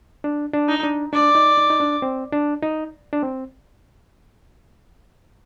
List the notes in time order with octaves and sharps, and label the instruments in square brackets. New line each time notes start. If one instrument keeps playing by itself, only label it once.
[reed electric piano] D4
D4
[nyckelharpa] D#4
[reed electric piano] D4
[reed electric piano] D4 [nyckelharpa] D5
[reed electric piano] D#4
D#4
D#4
D4
C4
D4
D#4
D4
C4